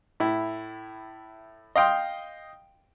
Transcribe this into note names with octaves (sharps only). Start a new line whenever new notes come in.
A2 E4
D#5 F5 G5 C6